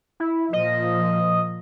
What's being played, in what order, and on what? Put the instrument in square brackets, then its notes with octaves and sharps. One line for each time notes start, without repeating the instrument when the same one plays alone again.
[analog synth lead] E4
[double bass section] A#2 F3 [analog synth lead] D#5